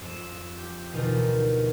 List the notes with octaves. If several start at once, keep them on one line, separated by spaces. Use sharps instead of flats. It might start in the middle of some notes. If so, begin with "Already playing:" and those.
F2 E7
G4
D2 B2 E3 D#4 F4 A#4